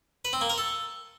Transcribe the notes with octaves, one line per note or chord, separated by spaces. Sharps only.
B4
C4
A#3
A#4
A4